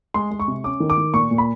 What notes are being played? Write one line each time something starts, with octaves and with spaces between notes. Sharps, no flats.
G#3 C6
G#3
C#6
C3
C#4 D6
D#3
D6
D#3
A#2 C#6
A#2
B5